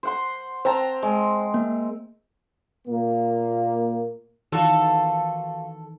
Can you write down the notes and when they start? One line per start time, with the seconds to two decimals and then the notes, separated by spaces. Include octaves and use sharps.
0.03 C5 F#5 C6
0.65 C4 C5 A5 A#5
1.02 G#3
1.54 A#3
2.88 A#2 A#3
4.52 D#3 E3 F4 F#4 A4